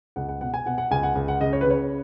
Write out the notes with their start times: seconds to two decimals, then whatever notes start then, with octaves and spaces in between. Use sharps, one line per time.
0.16 C#2 F#5
0.29 F#5
0.41 B2 F#5
0.54 G#5
0.66 B2 F#5
0.78 F#5
0.91 C#2 G#5
1.03 F#5
1.15 C#2
1.28 F#5
1.41 C#3 D#5
1.53 C#5
1.61 B4
1.66 C#3 C#5